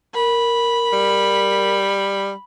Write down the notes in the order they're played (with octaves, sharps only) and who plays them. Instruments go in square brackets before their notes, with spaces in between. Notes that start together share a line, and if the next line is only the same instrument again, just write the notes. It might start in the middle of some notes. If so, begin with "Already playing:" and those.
[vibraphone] A#4 [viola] B5
[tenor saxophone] G3